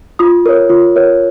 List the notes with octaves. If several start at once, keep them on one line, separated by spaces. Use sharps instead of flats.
F4 D#6
A#4 C#5
F4
A#4 C#5